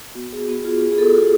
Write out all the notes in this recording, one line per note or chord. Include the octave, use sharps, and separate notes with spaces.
B3 F#4
B3 G#4
B3 F#4
F4 G#4
B3 G#4
G#4
B3 A4
F4 F#4